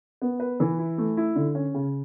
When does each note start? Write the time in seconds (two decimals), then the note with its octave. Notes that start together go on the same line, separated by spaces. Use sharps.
0.22 B3
0.40 B4
0.60 E3
0.78 E4
0.98 A3
1.17 E4
1.35 D3
1.55 C#4
1.74 C#3